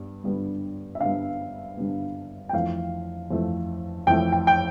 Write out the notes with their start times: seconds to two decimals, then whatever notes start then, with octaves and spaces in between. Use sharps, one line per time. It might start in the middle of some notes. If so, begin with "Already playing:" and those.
Already playing: G2 G3 B3
0.24 G2 D3 G3 B3
0.95 E5
1.01 G2 D3 G3 B3 F5
1.77 G2 D3 G3 B3
2.49 G5
2.53 F2 E3 A3 F5
3.30 F2 E3 A3
4.07 F2 E3 A3 G5
4.32 G5
4.47 G5